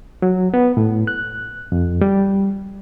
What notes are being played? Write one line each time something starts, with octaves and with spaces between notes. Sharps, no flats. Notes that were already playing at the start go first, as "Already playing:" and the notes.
F#3
B3
A2
F#6
F2
G3